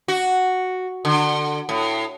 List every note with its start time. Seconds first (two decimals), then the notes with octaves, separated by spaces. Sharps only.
0.08 F#4
1.05 D3
1.69 A2